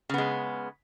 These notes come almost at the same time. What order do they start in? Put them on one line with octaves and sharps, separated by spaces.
C#3 B3 G#3